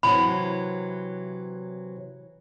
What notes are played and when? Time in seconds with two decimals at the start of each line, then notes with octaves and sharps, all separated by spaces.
0.03 C3 E3 F#3 B5